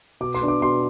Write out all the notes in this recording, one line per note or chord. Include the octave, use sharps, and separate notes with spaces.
B2 D6
C6
B3 D4
D6
B2 C6